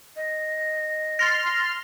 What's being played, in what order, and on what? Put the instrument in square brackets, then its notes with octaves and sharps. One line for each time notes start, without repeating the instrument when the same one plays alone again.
[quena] D#5
[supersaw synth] C6 F6 [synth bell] A6 A#6